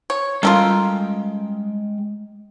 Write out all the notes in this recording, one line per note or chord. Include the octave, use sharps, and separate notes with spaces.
C#5
G3 G#3 C#4 F4 A4 A#4 G5